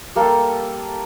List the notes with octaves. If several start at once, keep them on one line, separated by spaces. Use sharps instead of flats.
G3 A#3 A4 G5